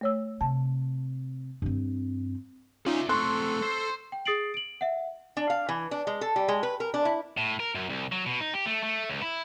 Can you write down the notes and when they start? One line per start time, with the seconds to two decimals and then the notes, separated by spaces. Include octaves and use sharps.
0.01 A3 C#5 E6
0.41 C3 A5
1.62 G2 C4
2.86 C#4 D#4 F4 D5 E5
3.09 A3 C4 A4 C6 C#6 F#6
3.63 C5
4.12 G5
4.25 G#4 D#6 A6 C7 D7 F#7
4.54 D7 F#7
4.81 E5 F#5
5.37 D4
5.50 F5
5.69 E3
5.91 D4
6.07 G#3
6.21 A4
6.36 G3
6.48 G#3
6.63 B4
6.80 A#4
6.94 D4
7.05 E4
7.37 A2
7.60 A#4
7.75 F#2
7.89 C2
8.12 F#3
8.26 B2
8.40 D#4
8.54 G4
8.66 A3
8.83 A3
9.09 C#2
9.22 E4